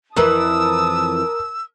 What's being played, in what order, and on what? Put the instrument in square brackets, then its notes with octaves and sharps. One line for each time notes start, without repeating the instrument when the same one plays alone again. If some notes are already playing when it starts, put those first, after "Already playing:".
[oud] F2 E3 B4 [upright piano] A#4 [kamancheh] A5 D#6 [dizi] E6